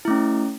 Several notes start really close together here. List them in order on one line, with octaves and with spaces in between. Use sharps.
E4 A3 C#4